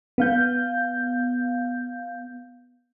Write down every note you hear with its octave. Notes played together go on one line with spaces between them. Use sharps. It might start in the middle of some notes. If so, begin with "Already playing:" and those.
B3 F5 G6